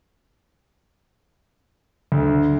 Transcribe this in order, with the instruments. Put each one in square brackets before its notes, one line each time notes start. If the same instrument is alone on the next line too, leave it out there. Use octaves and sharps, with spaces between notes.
[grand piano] D2